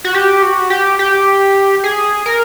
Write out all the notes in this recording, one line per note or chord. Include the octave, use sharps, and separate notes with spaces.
F#4
G4
F#4
G4
G4
G#4
A#4